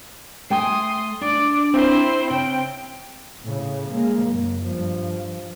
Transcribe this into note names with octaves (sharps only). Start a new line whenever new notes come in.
A3 G5 G#5 C6 D#6
D4 D5
C4 E4 C5
C#3 G5
A2 C#3
G#3 A#3
F#1
G2 F3